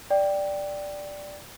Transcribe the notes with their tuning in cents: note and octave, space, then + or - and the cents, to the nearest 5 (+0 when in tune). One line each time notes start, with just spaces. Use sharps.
D5 +0 G5 +0